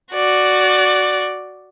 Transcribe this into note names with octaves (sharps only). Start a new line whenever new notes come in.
F#4 D5